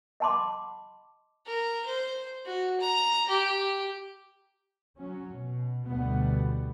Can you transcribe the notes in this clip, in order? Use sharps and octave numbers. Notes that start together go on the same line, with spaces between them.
D#5 F#5 A5 B5 C6 D6
A#4
C5
F#4
A#5
G4
F#3 C#4
B2
D2 B2 G3 B3